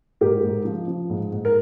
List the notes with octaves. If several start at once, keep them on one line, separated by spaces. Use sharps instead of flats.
G#2 G4 A#4
G#2
F3
F3
G#2
G#2
A#4